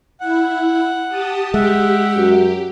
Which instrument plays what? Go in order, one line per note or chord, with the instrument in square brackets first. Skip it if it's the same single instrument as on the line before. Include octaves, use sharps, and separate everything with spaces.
[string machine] E4 [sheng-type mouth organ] F#5
[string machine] G4 A5 D#6
[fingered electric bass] G#3 [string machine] G4 [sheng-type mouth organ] E5 F#5
[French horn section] F#2 F#4